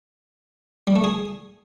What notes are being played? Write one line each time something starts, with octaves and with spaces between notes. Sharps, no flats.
G3
A3
G#4